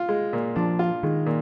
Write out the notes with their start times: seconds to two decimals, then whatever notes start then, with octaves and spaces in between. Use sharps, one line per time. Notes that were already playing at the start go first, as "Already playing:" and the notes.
Already playing: F4
0.09 G#3
0.33 A#2
0.56 F3 D4
0.79 F4
1.03 D#3 G#3
1.26 A#2